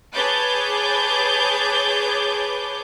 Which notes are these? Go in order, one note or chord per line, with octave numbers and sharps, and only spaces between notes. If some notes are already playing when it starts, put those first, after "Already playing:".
G#4 B4 C#5 A5 D6 G6